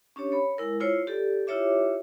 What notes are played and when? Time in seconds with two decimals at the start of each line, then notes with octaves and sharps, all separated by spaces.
0.16 C#4 D4 G4 C#5
0.32 C#5 B5
0.58 G#3 E4 A#4
0.80 E4 F4 C5 C#5
1.07 G4 A4 D5
1.47 E4 F4 G4 C#5 E5 D6